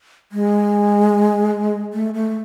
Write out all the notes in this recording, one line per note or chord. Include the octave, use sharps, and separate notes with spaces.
G#3
A3
A3